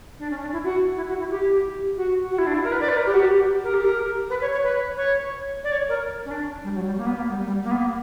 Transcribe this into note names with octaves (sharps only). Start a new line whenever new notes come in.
D4
C#4
D4
E4
F#4
E4
F#4
E4
G4
F#4
F#4
E4
D4
E4
A#4
B4
D5
B4
A#4
G4
F#4
G4
A#4
G4
A#4
B4
C#5
C#5
B4
C#5
D5
C#5
A#4
C#4
D4
G3
F#3
G3
A#3
B3
A#3
G3
G3
A#3
B3
A#3